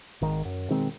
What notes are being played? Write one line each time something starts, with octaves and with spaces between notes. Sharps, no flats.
G#1 D#3
F#2
B2 D#3 G#3 C4